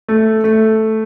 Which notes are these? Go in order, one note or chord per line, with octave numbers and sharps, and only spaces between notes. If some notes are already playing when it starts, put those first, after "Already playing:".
A3
A3